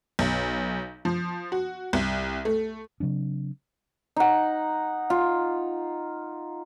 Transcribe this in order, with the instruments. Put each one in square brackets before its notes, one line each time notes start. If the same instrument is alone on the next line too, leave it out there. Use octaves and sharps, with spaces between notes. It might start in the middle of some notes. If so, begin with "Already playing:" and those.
[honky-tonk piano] B1
F3
F#4
C2
A3
[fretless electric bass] C#3 F#3 C4 D4
[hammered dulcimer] D#4 F#5
F4